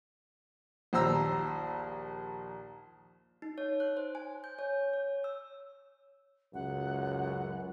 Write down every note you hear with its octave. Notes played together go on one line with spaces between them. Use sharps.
A#1 D#2 C5 A#5 E6
D#4
C#5
F#6
C5
G#5
G6
C#5
C#5
E6
C#2 F#2 F#5